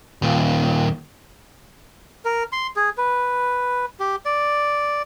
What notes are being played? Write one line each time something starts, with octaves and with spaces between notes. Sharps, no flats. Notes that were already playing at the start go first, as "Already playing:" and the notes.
D#2 A#2
A#4
C6
G#4
B4
G4
D5